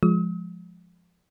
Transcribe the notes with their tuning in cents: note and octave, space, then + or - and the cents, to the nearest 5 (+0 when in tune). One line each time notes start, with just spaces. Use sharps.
F3 +0 G#3 +0 D#6 +45